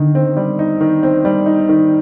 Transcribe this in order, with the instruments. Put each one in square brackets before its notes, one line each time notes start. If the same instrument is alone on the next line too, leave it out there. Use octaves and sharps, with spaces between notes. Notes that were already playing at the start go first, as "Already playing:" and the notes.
Already playing: [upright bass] D3 [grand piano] D#3 D#4
[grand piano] C4
G3
D#4
D#3
C4
G3
D#4
D#3